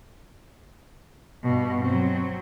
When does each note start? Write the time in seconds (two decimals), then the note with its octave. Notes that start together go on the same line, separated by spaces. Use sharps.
1.44 G2 B2
1.86 F#3 C4